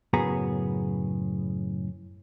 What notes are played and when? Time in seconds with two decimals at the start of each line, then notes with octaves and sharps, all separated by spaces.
0.13 F#2 A2 C#3 B3 G#4 A#5